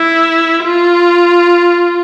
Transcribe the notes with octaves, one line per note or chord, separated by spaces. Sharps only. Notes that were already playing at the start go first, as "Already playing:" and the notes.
Already playing: E4
F4